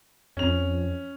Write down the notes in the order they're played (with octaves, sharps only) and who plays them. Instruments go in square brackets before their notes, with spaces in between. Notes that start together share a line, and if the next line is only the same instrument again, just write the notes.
[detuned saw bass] F2 [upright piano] C#4 F7